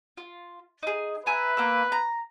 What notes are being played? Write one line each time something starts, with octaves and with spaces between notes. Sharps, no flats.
F4
D#4 G#4
B4 E5 G#5 A#5
A#3 A#5 E6
A#5